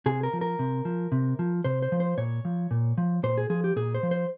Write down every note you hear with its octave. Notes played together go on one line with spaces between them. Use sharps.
C3 G#4
A#4
F3
A#4
C3
F3
C3
F3
C3 C5
C5
F3
C5
A#2 C#5
F3
A#2
F3
A#2 C5
G#4
F3 G#4
G4
A#2 G#4
C5
F3
C5